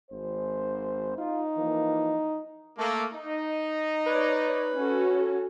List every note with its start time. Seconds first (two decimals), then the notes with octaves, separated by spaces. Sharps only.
0.11 G#1 C5
1.17 D#4 F4
1.57 E3 F3 A#3
2.78 A3 A#3
3.13 D#4
4.07 B4 C#5 D5
4.73 C#4 F#4 A4